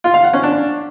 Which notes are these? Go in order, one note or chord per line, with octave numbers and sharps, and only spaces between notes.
F4
F5
F#5
C#4
D4